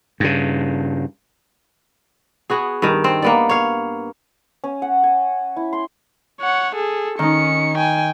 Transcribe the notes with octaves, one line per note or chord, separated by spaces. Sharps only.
G2 C#3
B3 F#4 G#4
G2 D#3
C4
A#3 B3 D5
C#5 F5
C#4
F#5
G#5
E4
C6
C#5 F#5
G#4 A4
D#3 C#4 D#4 C#7
G5 G#5